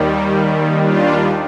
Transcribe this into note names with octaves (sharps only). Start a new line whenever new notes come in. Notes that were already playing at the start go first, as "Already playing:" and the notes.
Already playing: D#2 D#3 G3
D4 F4